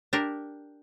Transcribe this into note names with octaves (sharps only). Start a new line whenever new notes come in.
D4 G4 A#4